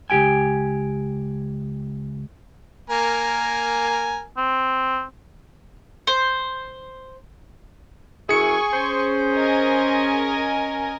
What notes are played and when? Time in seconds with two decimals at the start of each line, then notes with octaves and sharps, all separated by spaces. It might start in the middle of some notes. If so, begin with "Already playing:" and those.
0.10 C#2 F#2 G4 G5 G#5
2.90 A#3 A#4 G#5
4.37 C4
6.07 C5
8.29 F#2 E4 G#4 G#5 C#6 C#7
8.74 C#4 C5
9.34 A#4 D#5 G#5